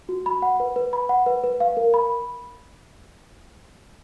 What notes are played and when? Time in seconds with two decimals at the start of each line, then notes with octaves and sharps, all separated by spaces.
0.09 F#4
0.26 B5
0.42 F#5
0.60 B4
0.76 B4
0.93 B5
1.09 F#5
1.26 B4
1.44 B4
1.60 F5
1.77 A#4
1.94 B5